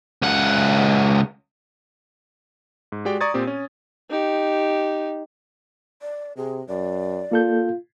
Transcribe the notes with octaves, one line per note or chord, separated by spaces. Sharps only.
C#2 F#5
G#2
G#3 F#4 G4 D5 G5
D5 A#5 C#6 D#6 G#6 A6
A#2 C4 G4
C#4
D#4 G4
D5
C3 G#4
F#2 D5
A#3 F4 A4 G6